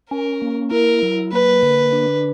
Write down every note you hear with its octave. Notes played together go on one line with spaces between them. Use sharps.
C#4 A#4
A#3
E4 A#4
F#3
A#3 B4
D3
D4